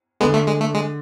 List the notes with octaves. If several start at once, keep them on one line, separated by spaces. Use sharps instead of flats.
D3 G#3 B3
A3
G#3
A3
G#3